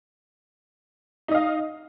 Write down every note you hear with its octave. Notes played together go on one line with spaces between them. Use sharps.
D#4 D#5 F5